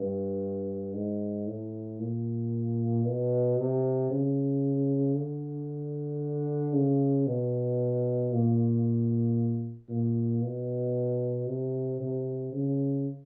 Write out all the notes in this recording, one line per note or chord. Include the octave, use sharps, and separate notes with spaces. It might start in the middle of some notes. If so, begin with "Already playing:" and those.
Already playing: G2
G#2
A2
A#2
B2
C3
C#3
D3
C#3
B2
A#2
A#2
B2
C3
C3
C#3